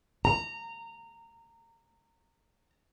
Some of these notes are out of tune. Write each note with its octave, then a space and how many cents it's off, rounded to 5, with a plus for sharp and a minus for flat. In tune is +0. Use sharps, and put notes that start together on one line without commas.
A#5 -20